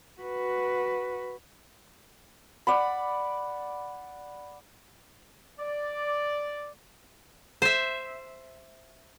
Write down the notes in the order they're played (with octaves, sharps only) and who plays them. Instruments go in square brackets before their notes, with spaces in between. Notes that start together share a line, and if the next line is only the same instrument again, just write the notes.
[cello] F#4 B4
[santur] D5 F#5 B5
[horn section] D5
[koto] C5 E5